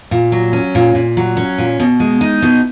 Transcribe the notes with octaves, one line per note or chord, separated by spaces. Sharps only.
A#2
F#3
C#4
A#2
A#2
F#3
C#4
A#2
B2
G#3
D#4
B2